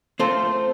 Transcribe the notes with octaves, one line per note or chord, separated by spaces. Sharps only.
A3 C4 F4 A4 C5